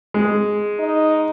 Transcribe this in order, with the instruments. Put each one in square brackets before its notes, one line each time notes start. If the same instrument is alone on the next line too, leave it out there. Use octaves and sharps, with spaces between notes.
[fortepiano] G#3
[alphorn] D#4